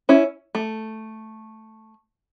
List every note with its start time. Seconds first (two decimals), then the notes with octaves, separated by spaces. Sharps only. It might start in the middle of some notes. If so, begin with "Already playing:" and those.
0.09 C#4 E4
0.55 A3